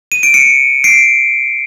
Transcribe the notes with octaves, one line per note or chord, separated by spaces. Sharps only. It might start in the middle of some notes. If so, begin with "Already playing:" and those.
D#7
D7
C#7 D#7
C7 D7